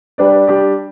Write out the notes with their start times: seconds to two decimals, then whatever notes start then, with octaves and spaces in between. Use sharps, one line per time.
0.18 G3 D4 B4 D5
0.47 G3 D4 G4 D5